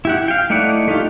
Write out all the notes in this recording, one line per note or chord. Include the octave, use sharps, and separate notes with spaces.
E4 G4 F#5
F5 G5
A3 D#4 E4 D5 F#5
A3 D#4 F4 G4